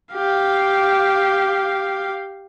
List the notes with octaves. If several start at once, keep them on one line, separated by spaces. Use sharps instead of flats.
G4 F5